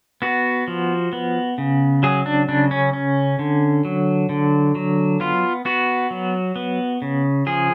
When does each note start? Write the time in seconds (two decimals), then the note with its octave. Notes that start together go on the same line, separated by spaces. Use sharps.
0.22 B3 F#4
0.68 F3
1.13 B3
1.58 C#3
2.03 F#3 G#4
2.26 D4
2.49 C#3 D4
2.71 C#4
2.93 C#4
3.39 D3
3.85 F#3
4.29 D3
4.75 F#3
5.20 B3 F4
5.65 B3 F#4
6.11 F#3
6.56 B3
7.02 C#3
7.46 F3 G#4